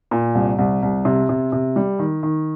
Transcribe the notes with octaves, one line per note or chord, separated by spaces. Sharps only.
A#2
C2
C2
C2
C3
C3
C3
G3
D#3
D#3